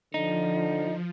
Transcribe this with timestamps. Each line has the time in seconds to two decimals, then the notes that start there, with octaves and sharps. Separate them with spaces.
0.14 D3 F3 D#4